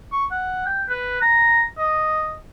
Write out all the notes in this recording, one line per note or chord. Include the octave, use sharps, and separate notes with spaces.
C#6
F#5
G5
B4
A#5
D#5